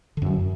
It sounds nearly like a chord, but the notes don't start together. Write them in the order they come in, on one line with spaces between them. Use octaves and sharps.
D3 F#2 F#3